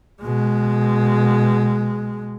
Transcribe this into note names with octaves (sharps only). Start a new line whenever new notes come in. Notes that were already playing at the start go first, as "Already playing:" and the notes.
B2 G#3